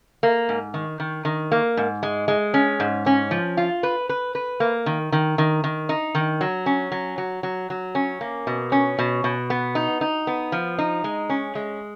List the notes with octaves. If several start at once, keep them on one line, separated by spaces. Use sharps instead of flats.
A#3
G#2
D#3
D#3
D#3
A#3
G#2
G#3
G#3
C#4
G#2
C#4
F3
F4
B4
B4
B4
A#3
D#3
D#3
D#3
D#3
D#4
D#3
F#3
C#4
F#3
F#3
F#3
F#3
C#4
A#3
B2
C#4
B2
B2
B3
D#4
D#4
B3
F3
D#4
G#3
C#4
G#3